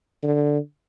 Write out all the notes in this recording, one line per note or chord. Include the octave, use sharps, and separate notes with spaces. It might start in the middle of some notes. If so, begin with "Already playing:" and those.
D3